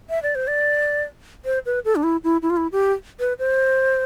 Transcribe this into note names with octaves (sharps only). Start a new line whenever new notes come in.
E5
D5
C5
D5
C5
B4
A4
D4
E4
E4
E4
F4
E4
G4
B4
C5